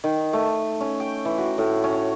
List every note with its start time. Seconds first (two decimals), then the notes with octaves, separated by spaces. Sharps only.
0.04 D#3
0.33 A3
0.80 C#4
1.00 G5
1.25 E3
1.38 F#4
1.58 A2
1.84 C#4